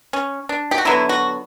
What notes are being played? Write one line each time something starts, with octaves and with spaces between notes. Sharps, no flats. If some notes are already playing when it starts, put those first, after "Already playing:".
C#4
D4
G4
F#4
D3 F#3 B3 E4
F#4